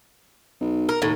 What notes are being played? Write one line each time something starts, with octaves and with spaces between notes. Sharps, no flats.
B1
A#4
D#2 A2